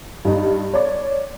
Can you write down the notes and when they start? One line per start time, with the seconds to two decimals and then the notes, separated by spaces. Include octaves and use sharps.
0.25 G2 D#4
0.73 C#5 D5